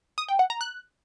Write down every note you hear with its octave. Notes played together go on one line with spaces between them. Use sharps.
D#6
G5
F#5
A#5
F#6